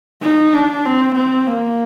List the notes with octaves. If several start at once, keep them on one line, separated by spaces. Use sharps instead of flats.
D#4
D4
C4
C4
A#3